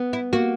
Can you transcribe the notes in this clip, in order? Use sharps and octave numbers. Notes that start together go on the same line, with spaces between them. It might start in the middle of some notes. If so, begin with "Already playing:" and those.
Already playing: B3
E4
A#3 F#4